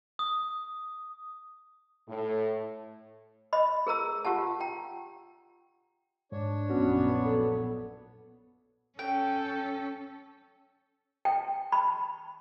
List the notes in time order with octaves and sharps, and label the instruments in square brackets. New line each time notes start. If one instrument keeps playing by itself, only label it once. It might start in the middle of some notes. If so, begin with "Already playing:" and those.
[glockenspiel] D#6
[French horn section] A2
[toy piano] D#5 B5
G#4 A#4 A#5 E6
F4 G4 F#5 A5
G5 A#5
[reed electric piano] G#2 [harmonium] D4 C#5
[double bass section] A#1 F#2 B3 [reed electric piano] C#4 F#4
[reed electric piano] A4
[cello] C#4 A4 [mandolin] G5
[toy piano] G5
B5